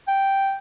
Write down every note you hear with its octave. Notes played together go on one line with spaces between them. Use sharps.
G5